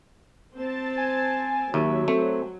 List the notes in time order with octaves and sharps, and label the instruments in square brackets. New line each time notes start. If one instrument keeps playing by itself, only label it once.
[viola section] C4 A5
[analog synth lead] G#5
[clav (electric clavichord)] D#2 [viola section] F#3 [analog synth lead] E5
[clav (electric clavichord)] A3 [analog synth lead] C4